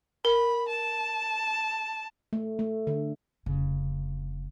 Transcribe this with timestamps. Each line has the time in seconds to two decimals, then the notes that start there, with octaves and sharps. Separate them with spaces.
0.25 A#4 B5
0.68 A5
2.33 A3
2.59 A3
2.87 D3
3.46 F1 C#3